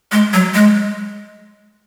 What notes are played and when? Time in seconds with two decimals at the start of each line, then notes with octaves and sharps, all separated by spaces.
0.12 G#3
0.33 F#3
0.54 G#3